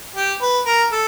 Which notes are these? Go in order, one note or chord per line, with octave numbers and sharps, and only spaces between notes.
G4
B4
A#4
A4